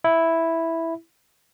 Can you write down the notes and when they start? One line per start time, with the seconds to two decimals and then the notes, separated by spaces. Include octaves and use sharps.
0.04 E4